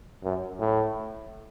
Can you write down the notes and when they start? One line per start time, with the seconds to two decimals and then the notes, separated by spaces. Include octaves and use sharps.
0.24 F#2
0.59 A2